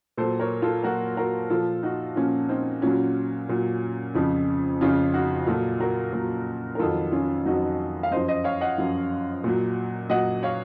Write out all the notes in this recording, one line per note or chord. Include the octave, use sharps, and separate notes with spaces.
A#2 F#3 A4 C5
A#4 C#5
F4 A4
A#2 F#3 F#4 A#4
F#4 A#4
A#2 F3 F4 A4
D#4 F#4
A#2 F3 C#4 F4
C4 D#4
A#2 F#3 C#4 F4
A#2 F#3
F2 C#3 F3
F2 C#3 F3 C#4 F4
D#4 F#4
A#2 F#3 F4 A4
F#4 A#4
A#2 F#3
A#4
F2 D#3 F#3 F4 A4
C#4 F4
F2 D#3 F#3 D#4 F#4
F5
F#2 F3 C5 D#5
C5 D#5
C#5 F5
D#5 F#5
F#2 F3
A#2 F#3
A#2 F#3 D#5 F#5
C#5 F5